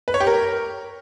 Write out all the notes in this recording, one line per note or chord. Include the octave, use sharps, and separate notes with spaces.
B4
C#5
G4
A#4